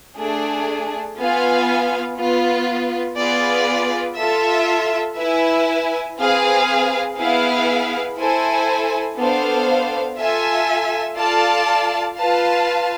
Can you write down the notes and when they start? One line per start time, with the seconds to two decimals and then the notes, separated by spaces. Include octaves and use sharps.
0.17 A3 D4 G#4
1.17 B3 F4 B4 F5 G#5
2.17 B3 F4 B4
3.17 B3 F4 G#4 B4 D5
4.17 F4 A4 E5
5.17 E4 B4 E5 G#5
6.17 C4 G#4 B4 F5
7.17 B3 E4 G#4 B4 F5
8.17 E4 A4 C5 G#5
9.17 B3 D4 A4 C5 F5
10.17 F4 A4 E5 G#5
11.17 F4 A4 D5 F5 A5
12.17 F4 B4 F5 A5